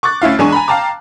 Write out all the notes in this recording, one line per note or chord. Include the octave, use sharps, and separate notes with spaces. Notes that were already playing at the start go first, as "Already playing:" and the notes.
C#6 D6 F#6 A6
D2 C#4 E4 F5
E2 G#3 D4 G#5 C#6
G#5 A#5 B5
F5 G5 A5 A#5 D6